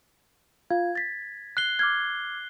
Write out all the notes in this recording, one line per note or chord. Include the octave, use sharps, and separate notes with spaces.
F4 F5 G#6
A6 B6
F#6 C7 G7
D6 F6 G#6